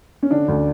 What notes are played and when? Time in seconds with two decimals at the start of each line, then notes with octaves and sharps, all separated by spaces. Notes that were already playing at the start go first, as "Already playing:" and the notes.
0.23 C#4
0.31 D3 D4
0.48 D2